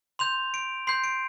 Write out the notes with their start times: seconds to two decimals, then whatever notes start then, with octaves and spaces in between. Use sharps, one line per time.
0.19 C6 G6 F7
0.54 D7
0.87 C6 G6 C7
1.04 D7